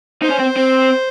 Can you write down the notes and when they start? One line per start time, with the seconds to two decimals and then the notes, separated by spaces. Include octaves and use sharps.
0.22 D#4 C5
0.30 C#4
0.39 C4
0.57 C4